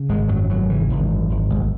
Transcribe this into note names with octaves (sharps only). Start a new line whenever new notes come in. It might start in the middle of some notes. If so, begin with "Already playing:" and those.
Already playing: C#3
G#1 G#3
F#2 F#3
G#1 F#3
C#3 E3
G#1
F#2
G#1
B1 G#3